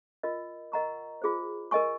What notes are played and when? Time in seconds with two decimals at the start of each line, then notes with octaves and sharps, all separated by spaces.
0.23 F4 A#4 D#5
0.72 A#4 D#5 F#5 A#5 C#6
1.22 F4 G#4 C5
1.71 A#4 D#5 G#5 C#6